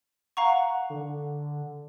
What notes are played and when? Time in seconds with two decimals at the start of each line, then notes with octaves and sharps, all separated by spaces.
0.37 F5 F#5 A#5 C#6
0.90 D3